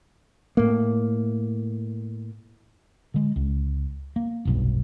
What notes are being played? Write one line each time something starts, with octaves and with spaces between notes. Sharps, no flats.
A2 A#3
D3 G#3
C#2
A#3
F1 B1 G2